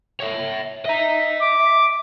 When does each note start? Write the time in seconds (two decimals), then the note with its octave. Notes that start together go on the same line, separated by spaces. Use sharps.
0.20 C#5 E5
0.85 D#5 E5 A#5
1.42 D6